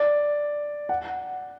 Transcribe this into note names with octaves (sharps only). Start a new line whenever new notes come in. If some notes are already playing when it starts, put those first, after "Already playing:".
Already playing: D5
F#5